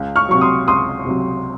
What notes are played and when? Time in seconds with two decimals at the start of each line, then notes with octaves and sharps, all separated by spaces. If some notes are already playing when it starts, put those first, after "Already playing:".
Already playing: C#2
0.16 C#6 F6
0.29 C3 F#3 C#6
0.41 C6 D#6
0.68 C#2 C6 D#6
1.05 C3 F#3